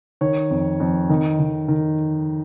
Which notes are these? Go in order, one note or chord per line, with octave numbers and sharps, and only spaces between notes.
D#3 C#5
F2
F2
D#3 D#5
D#3
D#3